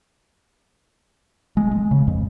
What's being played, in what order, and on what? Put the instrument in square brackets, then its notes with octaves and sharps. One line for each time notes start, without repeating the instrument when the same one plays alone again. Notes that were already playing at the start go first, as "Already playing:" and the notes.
[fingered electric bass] G#3
G#3
C#3
F2